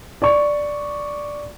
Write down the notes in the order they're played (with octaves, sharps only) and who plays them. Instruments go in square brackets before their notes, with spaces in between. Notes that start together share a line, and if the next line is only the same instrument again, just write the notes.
[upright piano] D5 C#6